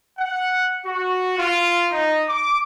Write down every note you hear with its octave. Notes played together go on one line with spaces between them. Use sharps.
F#5
F#4
F4
D#4
D6